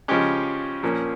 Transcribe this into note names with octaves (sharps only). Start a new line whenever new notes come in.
C#3 F3 G#3 C#4 G4
A#2 F3 A#3 C#4